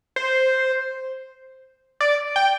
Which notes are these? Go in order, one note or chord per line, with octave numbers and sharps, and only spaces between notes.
C5
D5
G5